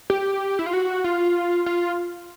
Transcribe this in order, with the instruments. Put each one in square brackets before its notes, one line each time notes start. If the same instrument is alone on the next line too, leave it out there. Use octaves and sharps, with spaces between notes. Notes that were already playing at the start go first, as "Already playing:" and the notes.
[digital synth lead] G4
E4
F4
F#4
F4
F4